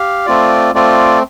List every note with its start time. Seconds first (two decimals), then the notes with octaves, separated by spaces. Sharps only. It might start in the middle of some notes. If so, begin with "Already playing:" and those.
Already playing: G4 F5
0.26 A3 C4 F4 D5
0.74 A3 C4 F4 D5